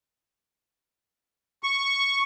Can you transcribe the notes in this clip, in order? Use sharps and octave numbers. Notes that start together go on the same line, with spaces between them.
C#6